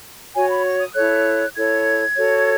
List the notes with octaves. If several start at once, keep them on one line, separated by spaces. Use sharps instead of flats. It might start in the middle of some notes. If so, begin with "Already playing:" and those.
F#4 C#5 G#5
B5
C#6
D#6
E4 A4 C#5 F#6
E4 A4 C#5 G#6
F#4 A4 C#5